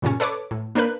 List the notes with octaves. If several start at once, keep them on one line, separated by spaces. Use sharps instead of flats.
G2 A#2 C#3 C#4
A4 B4 C#5 D6
A2
A#3 D4 A#4 B4 F#6